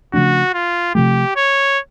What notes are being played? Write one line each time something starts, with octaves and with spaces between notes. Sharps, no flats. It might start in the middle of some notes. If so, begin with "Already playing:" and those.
C#3 F3 A3 D4 F#4
F4
C3 F3 A3 G4
C#5